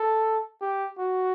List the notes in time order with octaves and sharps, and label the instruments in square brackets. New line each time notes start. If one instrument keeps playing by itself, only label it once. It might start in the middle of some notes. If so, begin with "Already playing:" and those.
Already playing: [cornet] A4
G4
F#4